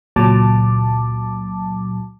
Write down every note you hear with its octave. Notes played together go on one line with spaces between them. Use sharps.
C#2 A#2 F#3 A5 D6